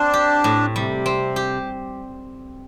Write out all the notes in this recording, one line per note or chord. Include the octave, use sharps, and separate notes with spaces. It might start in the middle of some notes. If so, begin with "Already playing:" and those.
Already playing: C4 D4
G4
A2
C3 G3
C4
G4